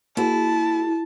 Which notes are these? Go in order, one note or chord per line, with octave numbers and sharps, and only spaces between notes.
A#3 E4 F#4 G#4 A5